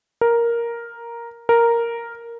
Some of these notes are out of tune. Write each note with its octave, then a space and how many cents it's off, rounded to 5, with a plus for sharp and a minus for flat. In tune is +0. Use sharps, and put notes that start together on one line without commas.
A#4 +5
A#4 +0